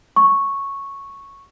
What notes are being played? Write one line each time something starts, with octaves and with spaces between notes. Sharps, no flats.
C#6